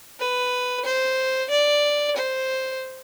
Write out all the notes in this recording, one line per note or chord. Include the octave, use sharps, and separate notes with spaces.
B4
C5
D5
C5